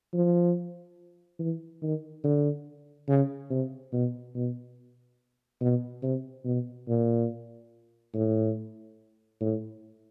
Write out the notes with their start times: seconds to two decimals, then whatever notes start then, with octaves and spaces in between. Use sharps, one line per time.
0.13 F3
1.39 E3
1.82 D#3
2.24 D3
3.08 C#3
3.50 C3
3.92 B2
4.35 B2
5.61 B2
6.03 C3
6.45 B2
6.88 A#2
8.14 A2
9.41 A2